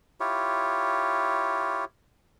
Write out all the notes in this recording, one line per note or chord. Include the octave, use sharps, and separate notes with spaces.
E4 F4 G4 C#5